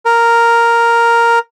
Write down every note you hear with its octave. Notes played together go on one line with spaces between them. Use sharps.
A#4